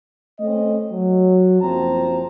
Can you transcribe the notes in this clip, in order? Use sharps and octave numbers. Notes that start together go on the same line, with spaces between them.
A3 C4 C#4 D#5
F#3
F#1 F#2 F3 C4 A5 A#5